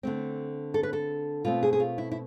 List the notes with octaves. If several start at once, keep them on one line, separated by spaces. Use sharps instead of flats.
D3 A3 C4
A4
B4
A4
B2 A3 C4 F4
G#4
G#4
F4
E4
E4